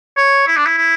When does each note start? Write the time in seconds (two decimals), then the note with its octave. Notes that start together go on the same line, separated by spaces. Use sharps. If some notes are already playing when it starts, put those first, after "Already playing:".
0.17 C#5
0.47 E4
0.56 D4
0.66 E4
0.78 E4